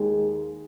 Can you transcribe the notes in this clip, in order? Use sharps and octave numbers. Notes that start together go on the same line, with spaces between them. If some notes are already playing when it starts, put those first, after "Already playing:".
Already playing: D#2 D#3 G#3 G#4